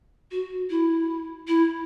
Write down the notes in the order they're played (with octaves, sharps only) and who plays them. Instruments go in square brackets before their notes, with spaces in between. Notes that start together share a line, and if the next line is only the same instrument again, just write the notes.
[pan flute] F#4
E4
E4